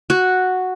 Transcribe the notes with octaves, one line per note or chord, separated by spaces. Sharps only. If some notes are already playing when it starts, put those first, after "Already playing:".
F#4